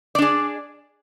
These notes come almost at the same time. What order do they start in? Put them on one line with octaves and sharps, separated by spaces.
D5 D4 G#4